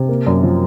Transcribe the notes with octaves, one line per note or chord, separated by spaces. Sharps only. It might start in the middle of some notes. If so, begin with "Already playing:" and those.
Already playing: C3
A#3
F#2
F3